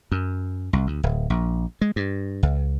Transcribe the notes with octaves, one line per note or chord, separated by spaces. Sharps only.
F#2
C2
D2
D1
A#1
G#3
G2
C#2